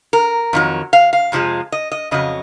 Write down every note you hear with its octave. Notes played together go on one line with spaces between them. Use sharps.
A#4
F2 D#3 F#3
F5
F5
F2 C3 F3 G#3
D#5
D#5
F2 C#3 F#3 D#5